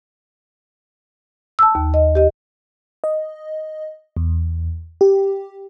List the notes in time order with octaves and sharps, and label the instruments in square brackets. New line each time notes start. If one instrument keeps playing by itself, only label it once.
[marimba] A5 E6
D#2
D#5
G4 D#5
[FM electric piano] D#5
E2
G4